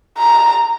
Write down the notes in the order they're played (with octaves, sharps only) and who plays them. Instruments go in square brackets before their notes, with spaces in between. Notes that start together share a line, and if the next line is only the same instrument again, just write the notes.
[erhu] A#5